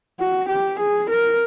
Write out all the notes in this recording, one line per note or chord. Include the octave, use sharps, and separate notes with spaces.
F#4
G4
G#4
A#4